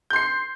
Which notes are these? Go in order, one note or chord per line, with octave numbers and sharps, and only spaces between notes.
C6 G6 C7